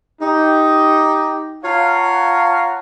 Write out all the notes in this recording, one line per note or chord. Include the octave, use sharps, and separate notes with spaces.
D#4 G4
F4 C#5 F5 F#5 A5 A#5